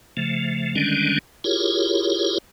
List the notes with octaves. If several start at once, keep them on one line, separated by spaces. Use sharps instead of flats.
C#3 F3 A3
D3 D#3 G3 G#3 C#4 D4
E4 F4 G4 G#4 A#4 C#5